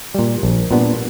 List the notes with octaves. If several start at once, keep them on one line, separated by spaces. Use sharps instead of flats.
A#2 G3
A#1
A#2 G3 B3 D4